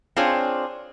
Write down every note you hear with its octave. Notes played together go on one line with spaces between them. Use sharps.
C4 D4 F4 G#4 C#5